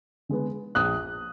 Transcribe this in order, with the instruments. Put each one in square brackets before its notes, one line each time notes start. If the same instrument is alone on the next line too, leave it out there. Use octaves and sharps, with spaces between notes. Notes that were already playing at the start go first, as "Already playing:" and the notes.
[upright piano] D3 G#3 B3
A#1 D#6 F#6